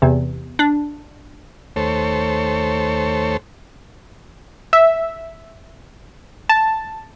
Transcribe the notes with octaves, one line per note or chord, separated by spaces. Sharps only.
E2 C3
D4
D#2 A3 A4 C5 C#5
E5
A5